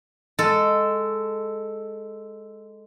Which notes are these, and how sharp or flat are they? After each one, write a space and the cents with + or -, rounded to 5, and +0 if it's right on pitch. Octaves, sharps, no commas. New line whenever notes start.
G#3 +0 A4 +0